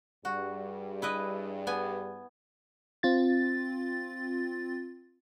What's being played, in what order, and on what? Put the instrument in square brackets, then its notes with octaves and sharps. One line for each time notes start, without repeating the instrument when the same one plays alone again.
[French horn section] G2 G3 G#4 [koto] F#4
[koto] E4 B4 D#5
B3 G#5
[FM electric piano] C4 F4 A6